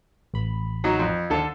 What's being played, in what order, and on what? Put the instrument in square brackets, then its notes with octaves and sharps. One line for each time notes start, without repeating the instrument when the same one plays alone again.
[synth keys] A1 B5
[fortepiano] F#3 D#4
F2
[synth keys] D#2 F5 [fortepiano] D3 A4